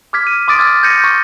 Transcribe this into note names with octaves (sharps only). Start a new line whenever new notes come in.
D6 F6 G#6 B6
D#7
C6 D6 D#6 A6 D7
E6 F6 G#6
G6 G#6 A#6 C#7 D#7
C#6